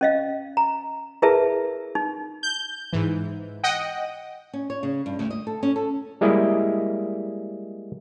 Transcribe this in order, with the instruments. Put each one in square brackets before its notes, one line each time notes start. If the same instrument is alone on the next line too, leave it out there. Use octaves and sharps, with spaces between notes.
[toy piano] C#4 D#5 F5
A#5
E4 G#4 A#4 B4 E5 A5
D#4
[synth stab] G6
G#2 E3
D#5 F#5 G5
[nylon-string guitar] C#4
C#5
C#3
G2
D2
D#5
A4
C#4
A4
[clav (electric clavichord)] G3 G#3 A#3 E4 D5 D#5